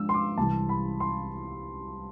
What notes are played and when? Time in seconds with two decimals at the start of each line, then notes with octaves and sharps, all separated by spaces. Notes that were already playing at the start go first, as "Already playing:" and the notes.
Already playing: G#2 F3 G#3 D4 E6
0.09 C6
0.14 D6
0.38 C2 C3 E3 A5
0.69 B5
1.00 C6